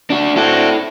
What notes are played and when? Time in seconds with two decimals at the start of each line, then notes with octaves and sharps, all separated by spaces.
0.10 D4 F#4
0.36 C4 D4 E4 F#4 A4